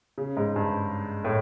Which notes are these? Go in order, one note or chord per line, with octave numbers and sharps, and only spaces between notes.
C#3
G#2
G2
A2